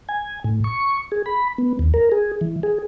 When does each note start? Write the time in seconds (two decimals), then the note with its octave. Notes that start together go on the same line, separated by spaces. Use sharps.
0.09 G#5
0.44 A2
0.64 C#6
1.12 G#4
1.26 B5
1.58 B3
1.79 D#2
1.94 A#4
2.12 G#4
2.41 E3
2.63 G#4